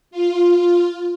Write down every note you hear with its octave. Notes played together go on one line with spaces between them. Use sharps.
F4